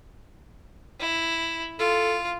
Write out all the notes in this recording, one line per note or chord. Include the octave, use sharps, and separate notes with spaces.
E4
F4 A4